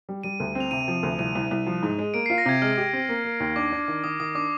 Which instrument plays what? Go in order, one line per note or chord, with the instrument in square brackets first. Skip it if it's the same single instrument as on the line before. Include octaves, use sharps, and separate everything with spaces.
[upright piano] G3
[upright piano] G3 [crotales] D#7
[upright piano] D2
C4
[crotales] F7
[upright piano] C3 [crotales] D#7
[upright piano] F3
D2
[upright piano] C2 [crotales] D#7
[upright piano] C2
C2
F3
G#2
G#3
[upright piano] A#3 [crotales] D7
[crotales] C7
[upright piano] F4
[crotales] A#6
[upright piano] C3 [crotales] G#6
[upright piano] G#3 [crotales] F6
[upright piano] G4
C4
A#3
A#3
D#2
[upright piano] D4 [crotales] D6
[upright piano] D4
D#3
[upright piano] D#3 [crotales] D#6
[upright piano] D#3 [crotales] D#6
[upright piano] D4 [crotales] D6